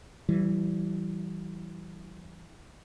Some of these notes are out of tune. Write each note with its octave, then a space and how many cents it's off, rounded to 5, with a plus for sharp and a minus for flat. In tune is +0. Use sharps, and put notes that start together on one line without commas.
E3 +0 G3 -35